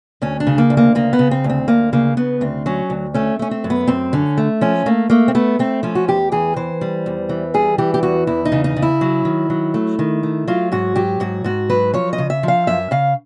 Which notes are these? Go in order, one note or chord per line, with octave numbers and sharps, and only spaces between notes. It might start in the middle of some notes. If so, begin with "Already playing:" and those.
D2 C#4
D4
C#3
A#3
D2
A#3
C#3 A#3
B3
C#3
C4
D2
C4
D2 A#3
C#3 A#3
C#3 B3
D2 C4
F#3 C#4
D2
A3 C#4
A3 C#4
C4
F#2
B3
F#2 C4
D3 C#4
A3
F3 C#4
A3 A#3
A3 A#3
C4
A3 B3
A3 C4
F3 C#4
F#4
E2 G4
E3 G#4
E3 C5
G3
E2
E3
G3 G#4
E3 G4
G4
E2 F#4
E2 E4
D#4
C#3
D#4
C#3
E4
F#3
D#3
F#3
A3
D#3
A3
F#3 F4
G#2 F#4
F#3 G4
G#2 F#4
G#2 F#4
F#3 B4
F3 C#5
D#5
C#3
E5
F3 F5
F#2 E5
C#3 F5